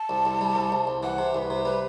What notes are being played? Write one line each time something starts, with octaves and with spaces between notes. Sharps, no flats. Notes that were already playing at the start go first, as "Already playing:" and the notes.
Already playing: A5
C2
C2
G3
C2
C2
C2
E3 F#5
C3
C2 B4 C5
C3
G3 B4